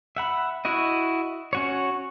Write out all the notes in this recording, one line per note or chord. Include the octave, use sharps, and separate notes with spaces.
E5 F#5 B5
E4 F#4 D#5
C#4 F#4 C#5